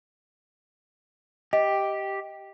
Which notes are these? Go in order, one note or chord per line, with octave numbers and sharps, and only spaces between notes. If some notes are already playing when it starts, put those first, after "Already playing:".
G4 D#5